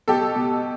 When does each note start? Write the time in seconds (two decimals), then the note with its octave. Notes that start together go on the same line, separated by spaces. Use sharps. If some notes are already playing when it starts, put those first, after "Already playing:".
0.08 B2 G4 A4
0.35 B2